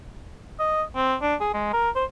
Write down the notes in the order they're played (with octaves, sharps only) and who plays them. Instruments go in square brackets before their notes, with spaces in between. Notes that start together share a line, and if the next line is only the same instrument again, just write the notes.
[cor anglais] D#5
C4
D4
G#4
G#3
A#4
C5